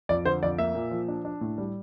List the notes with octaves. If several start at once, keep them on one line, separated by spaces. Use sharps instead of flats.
F2 D5
D3 C5
F2 D5
A#3 E5
A#2
F3
D4
D4
A2
G3